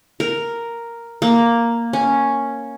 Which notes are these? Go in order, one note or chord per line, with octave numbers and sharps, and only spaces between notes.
A#4
A#3
C#4